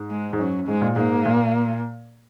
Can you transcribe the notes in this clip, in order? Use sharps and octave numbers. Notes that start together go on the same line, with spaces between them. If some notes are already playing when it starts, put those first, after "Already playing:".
Already playing: G#2
G#3
G#2
F#2 F#3
G#2 G#3
A#2
G#2 A#3
A#2